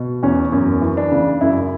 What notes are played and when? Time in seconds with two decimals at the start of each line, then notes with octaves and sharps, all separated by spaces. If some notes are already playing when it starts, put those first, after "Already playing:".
Already playing: B2
0.23 E2 C#4
0.52 F#2 C#4
0.82 E3
0.97 D4
1.12 C#3
1.41 F#2 E4